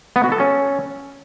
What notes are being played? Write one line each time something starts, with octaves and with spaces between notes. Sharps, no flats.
B3
F#4
A4
C#4